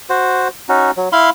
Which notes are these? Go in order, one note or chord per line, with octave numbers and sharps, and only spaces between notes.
F#4 C5
C#4 D#4 F#4
F#3
E4 F5 B5 C6